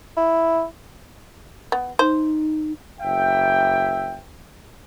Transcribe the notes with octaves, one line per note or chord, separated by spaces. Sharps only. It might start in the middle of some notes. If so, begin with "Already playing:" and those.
E4
B3
D#4 C5
F#1 E5 G5